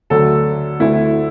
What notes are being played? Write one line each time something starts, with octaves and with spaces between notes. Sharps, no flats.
D2 D3 F#3 A3 A4
D2 D3 A3 E4